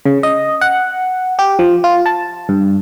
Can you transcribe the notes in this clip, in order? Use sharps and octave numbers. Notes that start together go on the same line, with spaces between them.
C#3
D#5
F#5
G4
F3
F4
A5
G2